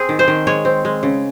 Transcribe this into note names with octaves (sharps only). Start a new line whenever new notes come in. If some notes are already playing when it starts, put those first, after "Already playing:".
Already playing: C4 G#4
D#3
C5
D#3
G#3 C#5
C4
G#3
C#3